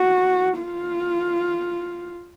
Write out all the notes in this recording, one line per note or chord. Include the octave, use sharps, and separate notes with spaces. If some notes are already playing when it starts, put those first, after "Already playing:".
Already playing: F#4
F4